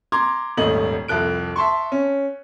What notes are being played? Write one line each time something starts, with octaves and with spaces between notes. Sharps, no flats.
A#5 C6 D6 G#6
D#1 G#1 G3 A3 D#5 F#7
C2 F2 A4 F#6 D7
E5 A5 C6 C#6
C#4